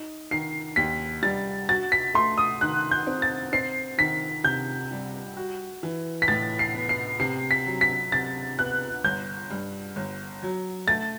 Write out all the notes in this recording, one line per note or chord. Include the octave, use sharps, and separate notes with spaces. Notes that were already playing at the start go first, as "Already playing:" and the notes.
Already playing: D#4
D#3 C7
D#2 B6
G3 A6
F#4 A6
B6
A3 C6
D#6
D#3 F#6
G6
C4
A6
C4 C7
D#3 B6
C3 G6
G3
F#4
E3
B6
A2 A6
C7
B3
C7
C3 C7
B6
F#3
B6
C3 A6
B3 F#6
G1 G6
G2
G1
F#3
A3 A6